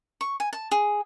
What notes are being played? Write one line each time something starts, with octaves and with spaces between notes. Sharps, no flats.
C#6
G#5
A5
G#4